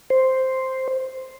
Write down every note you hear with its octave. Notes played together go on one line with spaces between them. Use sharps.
C5